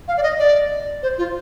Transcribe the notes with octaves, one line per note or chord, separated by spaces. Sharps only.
F5
D5
D#5
D5
C5
F4